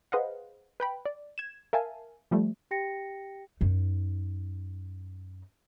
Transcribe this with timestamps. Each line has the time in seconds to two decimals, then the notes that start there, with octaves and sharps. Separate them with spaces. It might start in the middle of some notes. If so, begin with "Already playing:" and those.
0.12 G#4 B4 C5 D#5 F5 F#5
0.80 B4 G5 B5
1.05 D5
1.38 G#6 E7
1.73 A#4 E5 F5 G#5 A5
2.31 F3 G3 A3
2.71 G4 G5 A#6 C#7
3.61 F#2 D#4